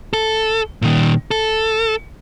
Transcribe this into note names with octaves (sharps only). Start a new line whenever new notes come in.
A4
A#2 D#3
A4